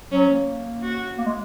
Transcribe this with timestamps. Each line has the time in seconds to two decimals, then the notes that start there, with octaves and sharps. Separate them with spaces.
0.12 F#3 C#4
0.30 A#3
0.83 F#4
1.17 A#3
1.26 G#3